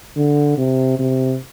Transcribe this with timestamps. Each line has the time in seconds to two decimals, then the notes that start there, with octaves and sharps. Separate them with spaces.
0.16 D3
0.58 C3
0.99 C3